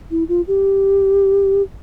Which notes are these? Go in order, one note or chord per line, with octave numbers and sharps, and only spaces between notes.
E4
F4
G4